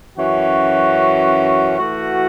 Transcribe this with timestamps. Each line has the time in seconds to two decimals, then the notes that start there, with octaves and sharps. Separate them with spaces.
0.17 F#2 E3 C#4 F#4
1.77 E3 A3 F#4